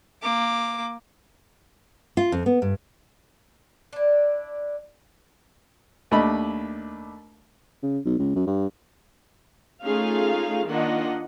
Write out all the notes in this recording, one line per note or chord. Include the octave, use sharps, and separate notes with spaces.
A#3 D6
F4
F2
B3
G2
D4 E4
D#2 A3 D4 D#5 B5
C#3
B1
C#2
F#2
G2
A3 C#4 D#4 F4 G#4 F5
D#3 A#3 D4 F4 D#5 F#5